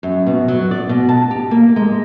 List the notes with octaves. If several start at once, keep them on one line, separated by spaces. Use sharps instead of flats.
F#2
B2
F#3
D5
B2
A5
G4
A#3
G#3